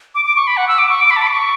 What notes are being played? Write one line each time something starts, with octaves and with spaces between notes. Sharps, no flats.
D6
D6
C#6
B5
F#5
E6
D6
C#6
D6
B5
A5
B5
D6
C#6